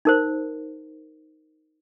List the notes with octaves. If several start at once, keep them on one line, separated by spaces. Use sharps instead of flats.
D#4 A#4 C5